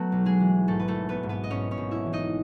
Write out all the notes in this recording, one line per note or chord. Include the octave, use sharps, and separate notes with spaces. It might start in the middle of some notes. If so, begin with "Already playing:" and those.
Already playing: F#3 A3 B3 F#4 A4 B4
B1
G#3 G#4
E3
G#1 A3 A4
B4
A3 A4
E3
B3 B4
G#2
B3 B4
D#5
G#1 C#4 C#5
C#4 C#5
G#1
E4 E5
E3
D#4 D#5